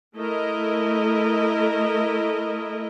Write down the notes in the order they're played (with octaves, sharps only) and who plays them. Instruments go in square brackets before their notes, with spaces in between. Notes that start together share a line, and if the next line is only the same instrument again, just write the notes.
[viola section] A3 E4 A#4 D#5